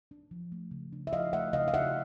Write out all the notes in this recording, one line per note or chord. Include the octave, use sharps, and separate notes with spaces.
D4
F3
A3
C#3
D4
E5
F3 D#5 F5
A3 E5 F#5
C#3 D#5 F5
F5
D4 E5 F#5